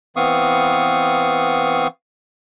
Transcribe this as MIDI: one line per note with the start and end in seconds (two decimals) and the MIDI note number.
0.16 1.87 52
0.16 1.87 59
0.16 1.87 60
0.16 1.87 77
0.16 1.87 85
0.16 1.87 87